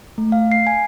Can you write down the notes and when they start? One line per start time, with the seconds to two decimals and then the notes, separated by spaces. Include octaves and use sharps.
0.18 A3
0.32 F5
0.52 C7
0.67 G#5